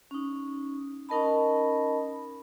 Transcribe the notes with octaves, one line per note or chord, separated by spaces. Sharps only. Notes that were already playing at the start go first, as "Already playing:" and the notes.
C#4 D#4
C#4 D#4 A#4 D#5 A5 B5